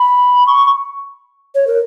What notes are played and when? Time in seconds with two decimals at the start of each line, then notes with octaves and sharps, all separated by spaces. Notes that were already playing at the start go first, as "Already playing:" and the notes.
Already playing: B5
0.47 C#6
1.55 C#5
1.67 A#4